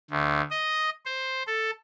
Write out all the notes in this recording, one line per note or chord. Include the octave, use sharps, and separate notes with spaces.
D2
D#5
C5
A4